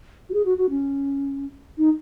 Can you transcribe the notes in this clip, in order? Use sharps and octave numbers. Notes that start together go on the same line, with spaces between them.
F#4
G#4
F#4
F#4
C#4
D#4